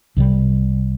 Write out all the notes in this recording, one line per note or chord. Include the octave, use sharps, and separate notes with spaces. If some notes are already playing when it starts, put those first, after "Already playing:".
C2 C3 G3